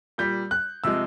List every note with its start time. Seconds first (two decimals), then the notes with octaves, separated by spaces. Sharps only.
0.18 A#2 G3 G6
0.51 F#6
0.84 C3 F3 G#3 E6